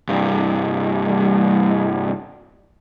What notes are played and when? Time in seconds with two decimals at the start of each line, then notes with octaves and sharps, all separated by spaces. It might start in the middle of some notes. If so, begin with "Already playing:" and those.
0.09 C2 G2